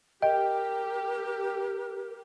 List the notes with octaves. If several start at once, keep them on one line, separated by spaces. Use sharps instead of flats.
G4 A#4 D#5 G5